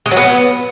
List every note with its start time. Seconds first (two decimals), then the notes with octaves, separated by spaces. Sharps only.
0.06 G#3
0.11 F#3
0.17 B3